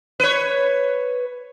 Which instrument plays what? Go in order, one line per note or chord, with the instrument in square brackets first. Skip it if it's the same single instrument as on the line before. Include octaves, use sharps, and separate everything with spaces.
[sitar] B4 C#5